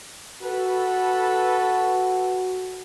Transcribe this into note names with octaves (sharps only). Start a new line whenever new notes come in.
F#4 A4 B4